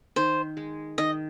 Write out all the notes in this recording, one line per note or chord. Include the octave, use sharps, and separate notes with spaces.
D#3 C5
G#3
D#3 D#5